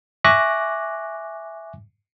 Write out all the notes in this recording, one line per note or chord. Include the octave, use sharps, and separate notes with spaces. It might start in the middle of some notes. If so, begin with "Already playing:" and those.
E5 G#5 C#6 D6 F#6 A#6